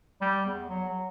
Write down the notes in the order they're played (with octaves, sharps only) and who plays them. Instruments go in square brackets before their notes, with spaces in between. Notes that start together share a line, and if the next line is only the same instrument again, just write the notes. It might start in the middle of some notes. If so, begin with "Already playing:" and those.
[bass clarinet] G3
E2
F#3
F#3